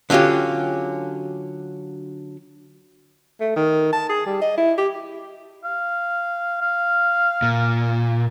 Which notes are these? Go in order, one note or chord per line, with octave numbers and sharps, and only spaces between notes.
D3 F#3 C#4 F4 G4
A3
D#3
A5
G#4
G3
D#5
E4
G4
F5
F5
A#2